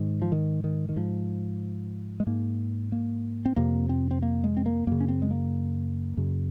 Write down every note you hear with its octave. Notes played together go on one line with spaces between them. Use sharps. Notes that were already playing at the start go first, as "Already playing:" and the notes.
Already playing: G#2 D#3
F3
D#3
D#3
D#3
G#2 F3
G#3
G#2 A#3
A#3
C4
F2 C3 A#3
C4
C4
A#3
G#3
C4
A#3
F#2 C#3 A#3
C#4
C4
G#3
A#3
F#2 C#3